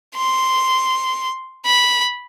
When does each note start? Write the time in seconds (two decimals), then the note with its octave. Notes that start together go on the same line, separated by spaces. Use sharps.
0.16 C6
1.65 B5